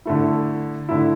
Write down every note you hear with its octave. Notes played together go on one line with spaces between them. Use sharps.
D3 A3 E4
D3 A3 E4